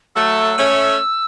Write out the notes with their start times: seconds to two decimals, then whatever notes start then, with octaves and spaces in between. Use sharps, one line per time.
0.15 F#3 A3 E6
0.58 A3 C#4